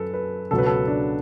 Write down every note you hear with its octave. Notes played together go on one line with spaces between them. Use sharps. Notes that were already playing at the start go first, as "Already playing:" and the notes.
Already playing: F#2 A4 B4
B4
C#2 B2 F#3 A4
B4
A4
D4